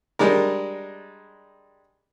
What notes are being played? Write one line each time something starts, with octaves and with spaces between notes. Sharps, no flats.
G3 G#3 D4 A#4